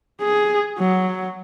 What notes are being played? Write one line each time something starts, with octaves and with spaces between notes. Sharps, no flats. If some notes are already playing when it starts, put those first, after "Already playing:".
G#4
F#3